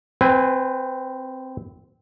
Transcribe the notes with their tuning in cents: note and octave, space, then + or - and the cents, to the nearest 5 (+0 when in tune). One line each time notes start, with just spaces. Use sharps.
C4 -5 B4 +20 G#5 -30